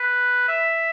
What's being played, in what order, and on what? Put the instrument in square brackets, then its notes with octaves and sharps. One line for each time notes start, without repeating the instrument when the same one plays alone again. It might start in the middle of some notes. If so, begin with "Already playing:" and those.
Already playing: [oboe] B4
E5